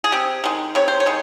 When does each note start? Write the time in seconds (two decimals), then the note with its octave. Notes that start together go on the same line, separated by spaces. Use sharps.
0.04 G#4
0.12 C3 G4
0.44 D#3 G#3
0.75 C3 C#5
0.88 C5
1.00 C#5
1.06 D#3 G#3